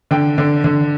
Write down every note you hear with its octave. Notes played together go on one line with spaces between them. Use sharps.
D3 G5
D3
D3